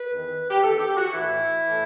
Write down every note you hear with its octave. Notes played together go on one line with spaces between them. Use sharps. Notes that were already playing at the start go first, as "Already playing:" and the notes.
Already playing: B4
E2 D#3
G4
E2 D#3 A4
G4
F#4
A2 E3 E4
A2 E3